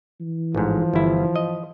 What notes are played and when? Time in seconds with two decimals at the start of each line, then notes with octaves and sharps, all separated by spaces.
0.20 E3
0.55 A1 G#2 F3
0.94 G1 E4
1.36 D#5